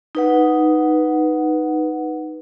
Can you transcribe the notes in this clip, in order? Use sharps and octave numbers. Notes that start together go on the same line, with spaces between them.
D#4 B4 F#5